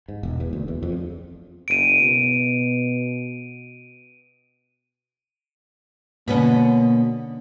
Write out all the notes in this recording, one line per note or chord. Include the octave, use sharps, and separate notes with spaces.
G#2
E1
E2
D2
E2
F2
F#1 D7 D#7
B2
B2 D3 A#3 B3 C#4 D#5 B5